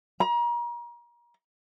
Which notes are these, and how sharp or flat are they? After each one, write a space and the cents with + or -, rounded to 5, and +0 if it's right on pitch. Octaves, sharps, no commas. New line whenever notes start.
A#5 +35